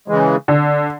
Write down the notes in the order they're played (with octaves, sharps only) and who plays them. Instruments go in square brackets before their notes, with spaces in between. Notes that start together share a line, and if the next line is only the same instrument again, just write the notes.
[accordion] C#3 E3 G#3
[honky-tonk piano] D3